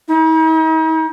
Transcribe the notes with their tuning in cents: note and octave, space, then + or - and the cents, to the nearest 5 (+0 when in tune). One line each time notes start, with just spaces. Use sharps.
D#4 +45